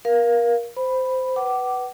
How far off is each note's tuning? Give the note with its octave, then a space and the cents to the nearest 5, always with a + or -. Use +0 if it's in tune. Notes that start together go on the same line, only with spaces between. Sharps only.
A#4 +25 F5 +0
C5 -15 B5 +0
B4 +0 F#5 +35 D6 +0